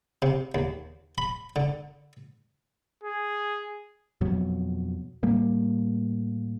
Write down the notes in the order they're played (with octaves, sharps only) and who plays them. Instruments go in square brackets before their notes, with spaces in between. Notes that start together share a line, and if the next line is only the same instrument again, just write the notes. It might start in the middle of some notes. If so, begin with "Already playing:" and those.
[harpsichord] C3
D#2
B5
D3
[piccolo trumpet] G#4
[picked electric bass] F2 B2 F#3
A2 G3 A#3